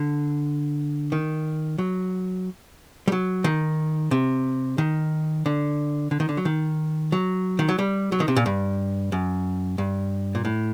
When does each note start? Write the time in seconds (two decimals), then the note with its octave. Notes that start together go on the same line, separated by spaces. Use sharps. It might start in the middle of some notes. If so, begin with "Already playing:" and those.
Already playing: D3
1.12 D#3
1.78 F#3
3.08 G3
3.12 F#3
3.44 D#3
4.11 C3
4.78 D#3
5.46 D3
6.11 D3
6.20 D#3
6.29 D3
6.37 F#3
6.45 D#3
7.12 F#3
7.59 D#3
7.69 F#3
7.79 G3
8.12 F#3
8.20 D#3
8.28 C3
8.36 A#2
8.46 G2
9.12 F#2
9.78 G2
10.35 A#2
10.45 A2